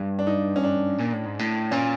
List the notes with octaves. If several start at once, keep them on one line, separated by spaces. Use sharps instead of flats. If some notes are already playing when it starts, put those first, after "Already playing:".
Already playing: G2
D4
D#4
C#4
D4
A#2
A2
G#2
A2
A#2 C#4